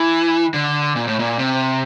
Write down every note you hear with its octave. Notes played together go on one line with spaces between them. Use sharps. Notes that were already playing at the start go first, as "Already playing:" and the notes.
Already playing: E3
D3
A#2
A2
A#2
C3